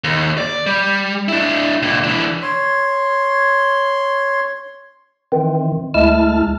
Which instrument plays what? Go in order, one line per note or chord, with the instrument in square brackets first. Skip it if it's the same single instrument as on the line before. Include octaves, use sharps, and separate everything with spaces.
[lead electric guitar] D#2
D5
G3
D4 E4
C#2 A#2
E3 D4
[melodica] C#5 C6
[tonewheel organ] D#3 E3 C4
D2 G#3 A3 E4 A5 F6